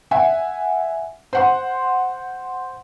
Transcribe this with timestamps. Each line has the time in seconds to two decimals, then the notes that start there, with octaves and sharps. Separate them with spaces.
0.11 E5 F#5 G#5
1.33 C5 F#5 C6